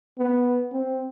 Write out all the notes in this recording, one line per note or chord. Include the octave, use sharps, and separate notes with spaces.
B3
C4